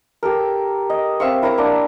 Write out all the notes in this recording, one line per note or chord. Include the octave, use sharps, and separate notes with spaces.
G4 A4 A#4
D#5
C4 E5 F5 C#6
E4 A#4 C#5 A#5
A#3 D4